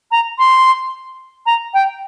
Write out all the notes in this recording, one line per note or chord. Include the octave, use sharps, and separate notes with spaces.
A#5
C6
A#5
G5